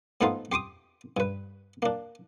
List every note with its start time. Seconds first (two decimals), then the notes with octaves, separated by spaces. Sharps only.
0.21 G#2 A3 B3 D#4 F4 C6
0.52 G4 C6 D6 D#6
1.17 G2 B4
1.82 A#3 D4